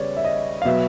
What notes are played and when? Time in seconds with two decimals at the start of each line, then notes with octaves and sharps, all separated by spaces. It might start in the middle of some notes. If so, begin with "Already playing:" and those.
Already playing: C#3 G3 B3 C#5 D5
0.17 E5
0.25 D#5
0.62 F5
0.65 B2 F#3 B3 E5